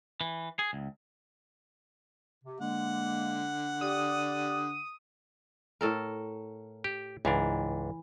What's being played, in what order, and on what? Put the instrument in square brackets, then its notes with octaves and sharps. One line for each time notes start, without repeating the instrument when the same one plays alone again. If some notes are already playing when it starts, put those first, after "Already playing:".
[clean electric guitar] E3
G#4
C#2
[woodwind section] C3
[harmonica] D3 F#5 [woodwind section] G#3 A#3
[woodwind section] G4 D5 [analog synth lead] D#6
[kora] A2 A4 A#4
[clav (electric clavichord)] G4
[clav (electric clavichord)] C#2 G#2 D4 [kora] E3